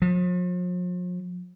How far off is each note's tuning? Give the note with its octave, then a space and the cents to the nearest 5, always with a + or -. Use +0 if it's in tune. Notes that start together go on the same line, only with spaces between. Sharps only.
F3 +40